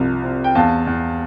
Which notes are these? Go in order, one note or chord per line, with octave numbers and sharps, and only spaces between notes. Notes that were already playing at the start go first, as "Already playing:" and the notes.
Already playing: C2 C3 F3
C4
G5
E2 F5 A5
E2